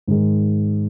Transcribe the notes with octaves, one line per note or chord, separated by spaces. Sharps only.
G#2 D#3 G#3